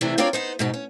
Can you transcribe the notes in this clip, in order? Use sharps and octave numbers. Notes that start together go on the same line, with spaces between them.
E2 C3 E3 A3 D4 C5
C4 D4 F4 A#4 C#5 D5
B3 D#4 C5
G#2 B2 D#4
C#4